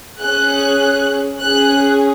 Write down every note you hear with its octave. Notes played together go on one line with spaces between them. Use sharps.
C#4 G#4 F#6
C#4 G#4 F#6